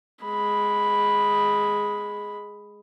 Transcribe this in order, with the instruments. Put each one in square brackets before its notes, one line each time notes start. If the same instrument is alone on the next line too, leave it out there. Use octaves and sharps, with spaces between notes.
[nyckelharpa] G#3 B5